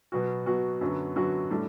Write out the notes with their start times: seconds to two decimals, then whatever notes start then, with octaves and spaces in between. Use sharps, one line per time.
0.12 B2 F#3 B3 F#4
0.46 B2 F#3 B3 F#4
0.81 F#2 D3 F#3 B3 F#4
1.16 F#2 D3 F#3 B3 F#4
1.50 A2 G3 D4 A4